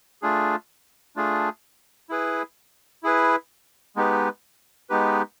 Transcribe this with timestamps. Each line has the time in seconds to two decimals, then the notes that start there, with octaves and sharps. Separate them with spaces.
0.22 A3 D4 F4 G#4
1.16 A3 D4 F4 G#4
2.09 E4 G#4 B4
3.03 E4 G#4 B4
3.96 G#3 B3 D#4 G4 B4
4.90 G#3 B3 D#4 G4 B4